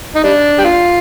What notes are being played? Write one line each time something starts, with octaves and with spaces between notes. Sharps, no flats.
D#4
G3 D4
G4
F4